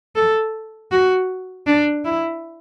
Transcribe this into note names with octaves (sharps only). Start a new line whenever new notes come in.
A4
F#4
D4
E4